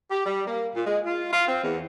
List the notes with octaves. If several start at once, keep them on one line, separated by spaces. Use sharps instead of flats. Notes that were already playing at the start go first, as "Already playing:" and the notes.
G4
G3
A#3
A#2
G#3
F4
F4
C4
E2